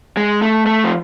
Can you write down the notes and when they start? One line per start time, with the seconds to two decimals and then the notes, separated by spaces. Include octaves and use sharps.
0.17 G#3
0.42 A3
0.66 A3
0.84 F3